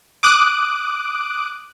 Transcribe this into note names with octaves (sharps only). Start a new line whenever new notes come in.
D6 D#6 F#6 D7